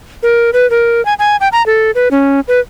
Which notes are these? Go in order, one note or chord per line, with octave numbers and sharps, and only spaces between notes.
A#4
B4
A#4
G#5
G#5
G5
A#5
A4
B4
C#4
B4